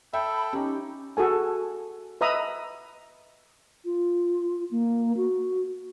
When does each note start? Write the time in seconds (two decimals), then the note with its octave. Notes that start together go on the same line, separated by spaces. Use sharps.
0.13 A4 E5 G5 B5
0.53 C#4 D#4 G4
1.17 F#4 G#4 A4 G#5
2.21 B4 D#5 E5 A#5 B5 D#6
3.85 F4
4.71 A#3
5.17 F#4